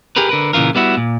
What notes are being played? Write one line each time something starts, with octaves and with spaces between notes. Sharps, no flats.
G4 G#4 A#4 B4
D3 A#4 B4
A#2 C#3 E3 F4 A#4
G3 B3 E4 F#4
A#2